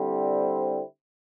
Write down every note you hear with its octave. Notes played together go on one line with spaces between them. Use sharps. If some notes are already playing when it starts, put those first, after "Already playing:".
Already playing: D3 G3 C4 E4